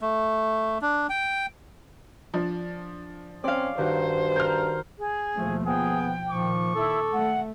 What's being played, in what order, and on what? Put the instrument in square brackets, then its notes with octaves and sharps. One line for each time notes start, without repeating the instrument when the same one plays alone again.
[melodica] A3
D4
G5
[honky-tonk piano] F3 D4
[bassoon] C4 [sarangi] C#4 [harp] D5 F5
[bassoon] G2 [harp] D#3 F#4 [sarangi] C5
[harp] A#4 [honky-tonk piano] F6 G6
[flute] G#4
[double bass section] D#2 B2 F3 [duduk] A3
[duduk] B3 [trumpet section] G#4 [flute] G5
[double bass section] A#2 D#3 [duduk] F3 [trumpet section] C#6 D6
[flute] E4 [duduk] A4
[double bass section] A3 [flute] F#5